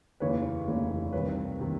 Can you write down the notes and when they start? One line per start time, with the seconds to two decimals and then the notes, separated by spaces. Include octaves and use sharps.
0.20 F1 D#2 C#3 E3 B4 C#5
0.67 F1 D#2 C#3 E3
1.12 C2 C3 D#3 B4 C#5
1.59 C3 D#3